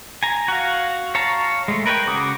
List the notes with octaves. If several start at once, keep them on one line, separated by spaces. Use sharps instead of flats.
G#5 A#5
F#4 F5
C#5 F5 A5 A#5
G#3 A3
A#4 B4 C#5 D#5 G5
C#3 F#4 D6 D#6